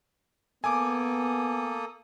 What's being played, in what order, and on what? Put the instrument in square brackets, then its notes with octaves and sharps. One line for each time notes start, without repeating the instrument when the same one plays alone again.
[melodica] A#3 A4 D#6 [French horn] B3 [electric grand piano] G#5 D6